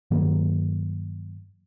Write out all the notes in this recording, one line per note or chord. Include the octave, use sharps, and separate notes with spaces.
G2 D#3 F#3 A#3